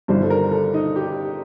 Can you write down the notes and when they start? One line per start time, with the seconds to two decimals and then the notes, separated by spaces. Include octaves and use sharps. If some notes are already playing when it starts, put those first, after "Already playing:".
0.08 G1 G2 D#3 G3 C5
0.23 A4
0.30 A#4
0.52 A4
0.74 D#4
0.96 G4